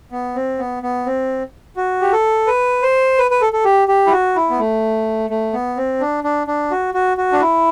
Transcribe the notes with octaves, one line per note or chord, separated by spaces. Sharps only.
B3
C4
B3
B3
C4
F#4
G4
A4
B4
C5
B4
B4
A4
A4
G4
G4
E4
F#4
E4
B3
A3
A3
B3
C4
D4
D4
D4
F#4
F#4
F#4
D4
E4